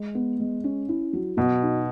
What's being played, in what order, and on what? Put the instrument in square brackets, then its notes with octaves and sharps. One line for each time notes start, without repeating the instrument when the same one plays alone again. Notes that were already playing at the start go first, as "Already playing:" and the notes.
Already playing: [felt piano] G#3
B3
G#3
C#4
E4
F#3
[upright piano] B2 [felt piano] F#3
[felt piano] D#4